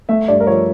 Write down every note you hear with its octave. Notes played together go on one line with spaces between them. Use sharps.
A3 E5
G2 D5
A#4
F3 C#5